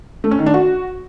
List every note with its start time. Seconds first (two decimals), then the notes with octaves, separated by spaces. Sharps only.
0.24 A3
0.31 C#4
0.39 D#3
0.46 D4
0.54 F#4